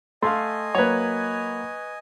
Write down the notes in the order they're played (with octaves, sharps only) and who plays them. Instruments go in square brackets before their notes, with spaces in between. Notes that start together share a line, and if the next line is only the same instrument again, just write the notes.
[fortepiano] A3 F5 [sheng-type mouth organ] D#5 G#5 [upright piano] C6
[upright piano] F#3 A#3 [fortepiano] B4 C#5